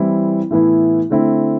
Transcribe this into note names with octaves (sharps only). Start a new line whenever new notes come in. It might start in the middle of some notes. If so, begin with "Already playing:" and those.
Already playing: E3 G3 C4 E4
A2 E3 B3 E4
D3 A3 C4 E4